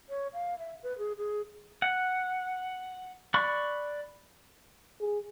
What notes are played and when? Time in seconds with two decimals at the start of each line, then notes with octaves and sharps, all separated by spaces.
0.09 C#5
0.33 F5
0.59 E5
0.83 B4
0.98 G#4
1.18 G#4
1.82 F#5
3.34 D5 B5 C#6 F#6
5.00 G#4